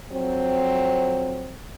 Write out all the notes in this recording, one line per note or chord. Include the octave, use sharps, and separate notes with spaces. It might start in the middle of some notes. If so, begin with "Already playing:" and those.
F2 F#3 C4